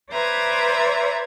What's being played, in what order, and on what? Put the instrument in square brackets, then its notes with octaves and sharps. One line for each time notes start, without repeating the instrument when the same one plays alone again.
[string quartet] B4 C5 D5 E5 A#5 G#6